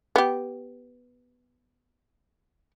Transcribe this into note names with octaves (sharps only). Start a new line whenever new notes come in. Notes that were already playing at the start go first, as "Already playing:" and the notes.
B3 G4